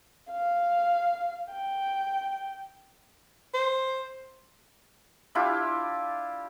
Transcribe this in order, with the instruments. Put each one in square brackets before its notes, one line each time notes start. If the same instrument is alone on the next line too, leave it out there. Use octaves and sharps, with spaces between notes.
[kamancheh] F5
G5
[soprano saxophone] C5
[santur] D4 E4 F4 G4